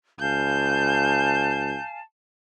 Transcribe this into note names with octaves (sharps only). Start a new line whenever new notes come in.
C#2 F5 G#5 A5 G6